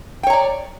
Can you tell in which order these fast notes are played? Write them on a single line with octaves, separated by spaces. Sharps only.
G5 C#5 A#5 D5